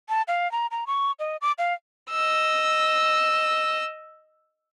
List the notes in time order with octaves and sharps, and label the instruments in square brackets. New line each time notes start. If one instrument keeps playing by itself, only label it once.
[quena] A5
F5
A#5
A#5
C#6
D#5
D6
F5
[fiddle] D#5 E6